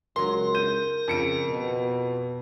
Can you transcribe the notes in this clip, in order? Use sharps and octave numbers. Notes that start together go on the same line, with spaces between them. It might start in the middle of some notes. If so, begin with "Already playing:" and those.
C#2 F#3 A#4 C6
G6 D#7
F2 C#3 C#7 D7
B2